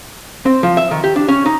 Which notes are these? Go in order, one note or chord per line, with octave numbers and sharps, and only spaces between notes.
C4
F3
E5
D#3
G4
D4
C#4
D#4